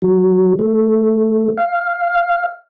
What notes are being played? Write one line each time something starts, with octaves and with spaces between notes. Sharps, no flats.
F#3
A3
F5